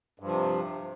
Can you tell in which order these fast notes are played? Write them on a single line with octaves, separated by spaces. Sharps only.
G2 F3 C3